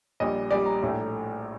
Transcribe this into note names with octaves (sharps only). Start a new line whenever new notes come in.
A#1 A#2 G3 D#5
A#1 A#2 G3 D5
A#5
A#1 A2 A3